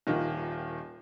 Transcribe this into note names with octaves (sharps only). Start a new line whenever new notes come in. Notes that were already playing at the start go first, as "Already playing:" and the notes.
D#1 D#3 F4